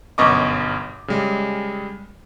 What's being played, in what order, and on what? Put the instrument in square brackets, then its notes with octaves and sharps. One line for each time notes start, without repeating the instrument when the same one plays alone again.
[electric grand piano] G1 F#2 B2 D#5 C#6 D6
C#3 G3 G#3